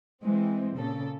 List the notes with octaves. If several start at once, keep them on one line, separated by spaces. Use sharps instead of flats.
E3 G#3 C4
A#2 C#3 A4